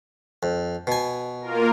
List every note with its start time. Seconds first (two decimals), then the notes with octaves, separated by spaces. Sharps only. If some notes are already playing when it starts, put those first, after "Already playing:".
0.43 F2
0.87 B2 G#5
1.41 A#3 F4 A#4